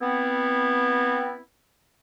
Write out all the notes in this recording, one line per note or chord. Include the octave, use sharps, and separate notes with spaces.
B3 C4 E4